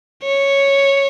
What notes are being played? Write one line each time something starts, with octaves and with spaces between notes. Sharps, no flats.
C#5